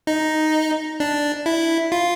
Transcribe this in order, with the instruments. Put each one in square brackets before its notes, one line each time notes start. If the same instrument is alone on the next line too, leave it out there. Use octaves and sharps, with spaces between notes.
[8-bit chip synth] D#4
D4
E4
F4